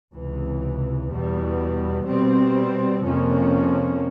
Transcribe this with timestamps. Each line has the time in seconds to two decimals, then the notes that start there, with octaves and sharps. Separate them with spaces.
0.13 C#2 C3 E3
1.10 E2 B2 G3
2.06 B2 G3 C4
3.03 F2 C3 F3 A#3 C#4